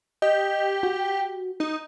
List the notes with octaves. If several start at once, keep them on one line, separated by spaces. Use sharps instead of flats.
G4 D#5
F#4
D#4